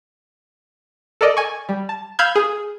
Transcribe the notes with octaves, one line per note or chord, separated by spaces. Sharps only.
A4 A#4 D5 D#5
G#5 C#6
G3
A5
F5 B5 E6 F6 G6 G#6
G#4